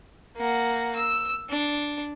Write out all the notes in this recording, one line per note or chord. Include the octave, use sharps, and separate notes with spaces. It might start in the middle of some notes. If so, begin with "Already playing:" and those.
A#3 F#5
E6
D4